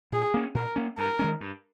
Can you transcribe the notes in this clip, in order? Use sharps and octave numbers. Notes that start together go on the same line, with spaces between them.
A#2 G#4
A#3 C#4
A#2 A#4
A#3 C#4
G2 A#4
D#3 G#3 C#4
G2